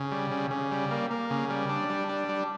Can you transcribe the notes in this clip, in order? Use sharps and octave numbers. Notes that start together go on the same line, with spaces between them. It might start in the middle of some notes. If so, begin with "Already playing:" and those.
Already playing: C#3
G3
C#3
C#3
G3
A#3
A#3
C#3
G3
D4
G3
D4
G3